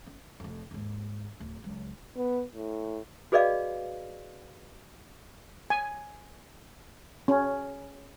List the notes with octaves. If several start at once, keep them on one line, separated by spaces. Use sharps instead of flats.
C#4
F1 F2
D#2 G#2
D1
C#2 F#3
B3
A2
F#4 G#4 B4 D5 D#5 F5
G#5
C#4